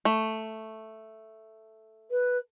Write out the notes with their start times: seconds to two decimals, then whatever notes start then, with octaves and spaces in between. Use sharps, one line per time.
0.05 A3
2.10 B4